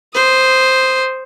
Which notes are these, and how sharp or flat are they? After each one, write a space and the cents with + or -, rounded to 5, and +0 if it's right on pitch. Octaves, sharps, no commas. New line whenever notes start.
C5 +0 D#6 +0